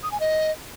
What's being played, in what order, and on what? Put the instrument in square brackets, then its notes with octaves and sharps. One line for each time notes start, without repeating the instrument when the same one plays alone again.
[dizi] D#6
G#5
D#5